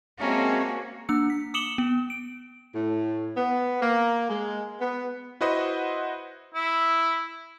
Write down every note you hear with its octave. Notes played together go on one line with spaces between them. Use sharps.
G#3 A#3 C4 C#4 F#4 E5 A5 A#5
A#3 D4 E6 C#7
B6
D6 D#6 C#7 E7 F#7 G7
B3
D7
A2
B3
A#3
G#3
B3
E4 F#4 B4 C5 D#5 F#5
E4